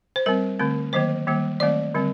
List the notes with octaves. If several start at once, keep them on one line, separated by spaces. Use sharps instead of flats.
C5
G3 C4 A#4
D3 A3 C4
D#3 F#3 A#3 C5
D#3 G3 A#3
D#3 F#3 A3 C4 D5
D3 G3 C4